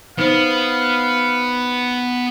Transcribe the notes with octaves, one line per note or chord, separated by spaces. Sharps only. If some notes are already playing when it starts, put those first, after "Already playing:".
B3 D#4 C5 F5